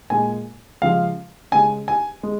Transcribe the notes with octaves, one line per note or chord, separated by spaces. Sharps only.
A#2 G#3 G#5
C#3 F3 G#3 F5
C#3 G#3 G#5
G#5
G#3